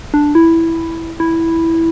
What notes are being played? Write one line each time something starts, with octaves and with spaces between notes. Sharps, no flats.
D4
E4
E4